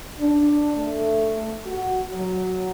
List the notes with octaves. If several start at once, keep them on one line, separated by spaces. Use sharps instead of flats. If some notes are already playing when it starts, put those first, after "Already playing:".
D4
A3
F#4
F#3